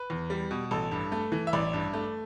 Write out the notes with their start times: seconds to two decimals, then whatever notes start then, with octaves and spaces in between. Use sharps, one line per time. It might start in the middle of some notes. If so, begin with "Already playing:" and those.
Already playing: B4
0.10 E2
0.30 G3
0.51 B2
0.71 A1 A4
0.92 G2
1.12 A3
1.32 E3
1.47 E5
1.53 A1 D5
1.73 G2
1.93 A3